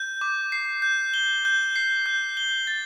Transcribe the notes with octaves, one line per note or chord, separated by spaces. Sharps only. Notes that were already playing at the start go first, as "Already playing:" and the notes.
Already playing: G6
D6
C7
G6
G7
G6
C7
G6
G7
A6